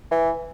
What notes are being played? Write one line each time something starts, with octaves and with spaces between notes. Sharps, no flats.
E3